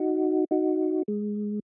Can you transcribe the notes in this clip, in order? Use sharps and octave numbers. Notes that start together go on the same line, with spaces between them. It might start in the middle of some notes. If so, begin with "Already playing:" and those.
Already playing: D#4 F#4
D#4 F#4
G#3